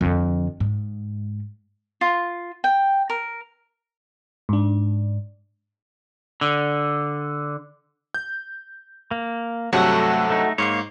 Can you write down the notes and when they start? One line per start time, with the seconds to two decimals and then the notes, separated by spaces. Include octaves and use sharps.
0.01 F2 D3
0.60 G#2
2.01 F4
2.64 G5
3.10 A#4
4.49 G#2 D4
6.41 D3
8.14 G6
9.11 A#3
9.73 G2 C3 F#3 A3 F#4 A4 F#5
10.30 A3 D#4
10.58 G#2 A#3 C#5 C7